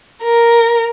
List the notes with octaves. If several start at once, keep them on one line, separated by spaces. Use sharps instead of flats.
A#4